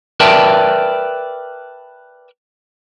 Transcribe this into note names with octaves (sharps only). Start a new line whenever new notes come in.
A#4 B4 D5 E5 G5 A5